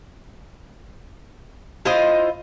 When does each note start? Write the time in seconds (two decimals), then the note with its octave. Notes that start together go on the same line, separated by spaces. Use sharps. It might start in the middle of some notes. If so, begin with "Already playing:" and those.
1.85 E4 F4 C5 D#5